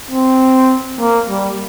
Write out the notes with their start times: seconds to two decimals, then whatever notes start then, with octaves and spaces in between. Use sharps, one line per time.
0.11 C4
1.00 A#3
1.30 G3